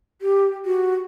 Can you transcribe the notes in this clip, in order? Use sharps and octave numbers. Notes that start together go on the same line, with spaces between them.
G4
F#4